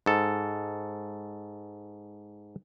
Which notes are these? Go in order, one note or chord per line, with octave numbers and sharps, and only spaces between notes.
G#2 A4